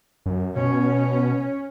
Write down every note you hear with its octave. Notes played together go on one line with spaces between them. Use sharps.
F#2
B2 C#4